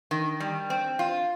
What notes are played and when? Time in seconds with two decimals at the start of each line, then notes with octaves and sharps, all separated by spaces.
0.11 D#3
0.40 G3
0.70 C4
0.99 F4